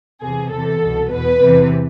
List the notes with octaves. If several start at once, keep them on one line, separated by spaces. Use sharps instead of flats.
E2 C3 E3 G#4
E2 C3 E3 A4
C2 B2
E2 B2 B4
E2 C3 E3